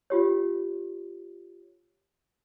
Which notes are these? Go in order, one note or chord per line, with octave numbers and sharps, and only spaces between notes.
F4 G4 C#5